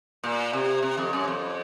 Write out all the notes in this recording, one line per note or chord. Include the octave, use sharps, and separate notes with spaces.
A#2
C3
C3
F2
F#2
F2